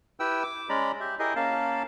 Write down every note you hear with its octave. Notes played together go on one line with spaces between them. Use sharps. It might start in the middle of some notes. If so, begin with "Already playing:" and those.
E4 G4 B4 G5 E6
D6
G#3 C#4 D5 A#5 B5
G4 E5
E4 G4 G#4 A#4 D#5
A#3 C#4 F5 A5